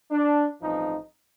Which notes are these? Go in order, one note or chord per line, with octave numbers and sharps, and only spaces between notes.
D4
A1 G2 F3 C4 D#4